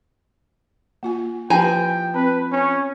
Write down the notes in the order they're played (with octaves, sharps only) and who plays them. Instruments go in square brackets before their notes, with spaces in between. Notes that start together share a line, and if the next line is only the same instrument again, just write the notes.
[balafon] A#3 F4 G#5
[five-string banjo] F3 G#5 A#5 [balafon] E4 G4 B4 [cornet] G5
[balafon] C4 [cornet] B4
[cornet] C#4